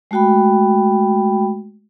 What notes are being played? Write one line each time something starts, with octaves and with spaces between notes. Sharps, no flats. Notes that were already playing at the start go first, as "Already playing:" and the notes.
G#3 A3 F#4 G5 B5